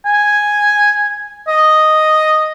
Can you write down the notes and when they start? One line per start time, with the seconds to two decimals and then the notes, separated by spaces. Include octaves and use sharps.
0.05 G#5
1.48 D#5